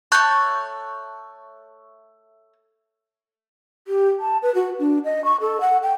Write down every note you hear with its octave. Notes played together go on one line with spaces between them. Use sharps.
A3 C#5 A5 C#6 F#6 G6
G4
A5
B4
F#4
D4
D#5
C#6
A4
F#5
G5